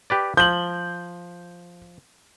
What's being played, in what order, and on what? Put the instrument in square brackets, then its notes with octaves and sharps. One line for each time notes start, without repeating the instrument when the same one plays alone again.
[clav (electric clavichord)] G4 B4 D5
[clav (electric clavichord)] F3 [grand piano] G6 F#7